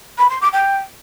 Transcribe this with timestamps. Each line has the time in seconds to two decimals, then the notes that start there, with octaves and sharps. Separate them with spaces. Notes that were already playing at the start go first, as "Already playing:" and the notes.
0.18 B5
0.30 C6
0.41 D6
0.53 G5